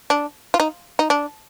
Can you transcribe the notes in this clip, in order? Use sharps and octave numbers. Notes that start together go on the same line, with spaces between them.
D4
F4
D#4
D#4
D4